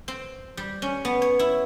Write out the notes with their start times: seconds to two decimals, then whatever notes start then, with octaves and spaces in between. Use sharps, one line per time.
0.08 C4
0.57 G3
0.82 C#4
1.05 B3
1.22 C#5
1.39 E4